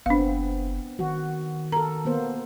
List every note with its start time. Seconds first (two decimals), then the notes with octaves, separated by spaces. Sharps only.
0.06 F#1 B3 C4 D4 F5
0.99 D#3 F#4
1.72 A4 A#4 A#5
2.05 A#3 B3 C5